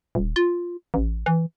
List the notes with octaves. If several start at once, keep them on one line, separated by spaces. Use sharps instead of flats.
D#1
F4
A1
E3